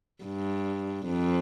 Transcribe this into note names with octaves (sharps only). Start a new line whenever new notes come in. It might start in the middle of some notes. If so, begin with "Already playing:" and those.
G2
F2